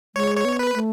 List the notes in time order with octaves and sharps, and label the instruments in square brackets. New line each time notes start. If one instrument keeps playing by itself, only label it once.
[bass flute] G#3 [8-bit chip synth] C#5
[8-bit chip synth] C#5
[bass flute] B3
[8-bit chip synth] B4
[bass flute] A3